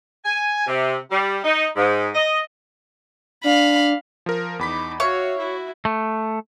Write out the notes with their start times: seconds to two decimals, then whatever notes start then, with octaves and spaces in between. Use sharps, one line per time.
0.24 G#5
0.66 C3
1.11 G3
1.44 D#4
1.76 G#2
2.15 D#5
3.44 D4 F5 B5
4.26 F3 A#4
4.59 E2 D#4 B5 D6 B6
5.00 F#4 C#5 E5 F5
5.38 E4 F#4
5.85 A3